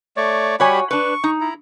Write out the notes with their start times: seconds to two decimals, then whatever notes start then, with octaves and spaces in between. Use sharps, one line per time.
0.17 A3 C#5 D5
0.60 G3 F#4 G4 C#5 G#5 B5
0.91 D4 B4 C#6
1.24 D#4
1.41 E4 A#5